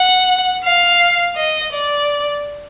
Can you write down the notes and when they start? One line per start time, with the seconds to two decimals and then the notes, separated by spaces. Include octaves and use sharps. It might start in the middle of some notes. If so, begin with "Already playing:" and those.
Already playing: F#5
0.64 F5
1.36 D#5
1.73 D5